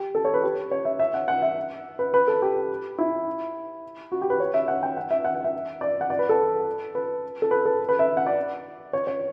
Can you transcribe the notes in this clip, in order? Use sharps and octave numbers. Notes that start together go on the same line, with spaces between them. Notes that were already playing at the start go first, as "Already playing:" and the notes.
Already playing: G4
A4
C#5
B4
G4
C#5
E5
E5
F#5
F#5
E5
B4
B4
A4
G4
E4
F#4
G4
B4
C#5
E5
F#5
G5
F#5
E5
F#5
F#5
E5
D5
F#5
D5
B4
A4
B4
A4
B4
A4
B4
E5
F#5
D5
C#5
C#5